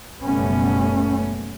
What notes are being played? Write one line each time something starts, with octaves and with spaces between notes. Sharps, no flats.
F#1 B2 G3 A3 B3 C#4